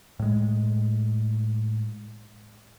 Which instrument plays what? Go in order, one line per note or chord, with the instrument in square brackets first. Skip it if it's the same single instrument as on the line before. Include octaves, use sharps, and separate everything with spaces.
[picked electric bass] A2 G#3